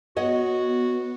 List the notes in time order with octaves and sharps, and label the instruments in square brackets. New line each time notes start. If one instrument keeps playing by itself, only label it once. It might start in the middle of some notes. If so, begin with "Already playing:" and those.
[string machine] B3 [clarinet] F#4 [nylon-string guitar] C#5 D#5 F#5